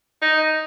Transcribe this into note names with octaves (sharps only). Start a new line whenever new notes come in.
D#4